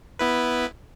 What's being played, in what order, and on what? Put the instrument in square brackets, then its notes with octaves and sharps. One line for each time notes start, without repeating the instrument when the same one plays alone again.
[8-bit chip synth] B3 E4 B4